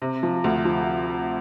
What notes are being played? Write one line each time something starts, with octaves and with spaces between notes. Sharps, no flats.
C3
F3
D2
F3